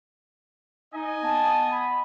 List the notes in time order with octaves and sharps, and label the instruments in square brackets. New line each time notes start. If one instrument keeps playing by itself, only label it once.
[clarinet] D#4 [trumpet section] D#5 G#5
[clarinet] B3 [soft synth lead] A5
[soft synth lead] B5